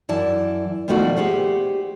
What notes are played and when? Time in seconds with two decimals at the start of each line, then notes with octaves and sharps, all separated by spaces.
0.09 F#2 E3 E4 D5 A5
0.88 D#2 B2 F3 A3 F#4 D5
1.17 G4 G#4 C5 F#5